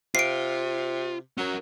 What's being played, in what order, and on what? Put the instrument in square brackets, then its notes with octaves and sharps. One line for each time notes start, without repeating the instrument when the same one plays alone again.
[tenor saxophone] C3 [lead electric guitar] F4 [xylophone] C7 D7
[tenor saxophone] F#3 [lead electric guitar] C#4 A#4